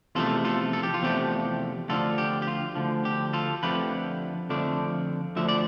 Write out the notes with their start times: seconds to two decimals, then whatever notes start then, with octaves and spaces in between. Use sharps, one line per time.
0.15 E2 C3 F3 A3 F4 A4
0.44 F4 A4
0.73 A4
0.83 G4
0.94 F4
1.02 E2 C3 F3 A3 G4
1.89 D2 D3 F3 F4 A4
2.18 G4
2.42 G4
2.47 F4
2.75 D2 D3 F3
3.05 G4
3.33 F4 A4
3.63 F2 D3 F3 A3 D4 G4 B4
4.50 F2 D3 F3 A3 D4
5.36 D2 D3 F3 E5
5.49 D5